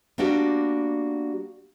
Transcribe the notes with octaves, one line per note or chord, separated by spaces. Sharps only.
G3 A#3 B3 D4 F#4 G4